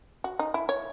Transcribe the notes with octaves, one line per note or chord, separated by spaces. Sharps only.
F#4
D#4
E4
C#5